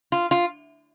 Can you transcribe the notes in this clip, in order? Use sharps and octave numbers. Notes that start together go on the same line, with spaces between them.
F4
F4